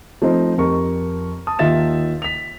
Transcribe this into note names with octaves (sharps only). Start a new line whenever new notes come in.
F3 A3 C4 D#4 C5
F2 G4 A#4 C#6
A5 D#6
D#2 D#3 F4 E5 A6 E7
B6 F7